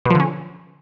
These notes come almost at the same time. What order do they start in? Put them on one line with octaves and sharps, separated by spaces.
B2 F3 D3 C#4